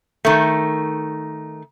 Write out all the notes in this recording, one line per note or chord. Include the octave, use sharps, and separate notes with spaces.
D#3 A3